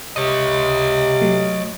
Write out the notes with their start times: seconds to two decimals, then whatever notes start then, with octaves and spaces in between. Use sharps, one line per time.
0.16 C3 C#5 D#5
1.21 F#3 A3